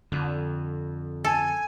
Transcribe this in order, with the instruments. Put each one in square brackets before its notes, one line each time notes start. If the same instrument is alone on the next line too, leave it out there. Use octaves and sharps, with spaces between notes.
[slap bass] F2 [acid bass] D3
[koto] A4 [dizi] G#5